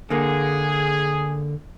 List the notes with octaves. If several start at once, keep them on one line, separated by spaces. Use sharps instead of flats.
D3 A#3 G#4